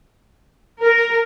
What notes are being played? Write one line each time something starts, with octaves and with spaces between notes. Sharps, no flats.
A#4